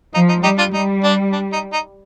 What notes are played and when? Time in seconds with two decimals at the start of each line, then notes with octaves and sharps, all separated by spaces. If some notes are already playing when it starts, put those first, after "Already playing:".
0.14 F3 D#4
0.29 D#4
0.43 G3 D#4 G4
0.58 D4 F4
0.73 G3 D#4
1.04 D4
1.32 D4
1.53 D#4
1.73 D#4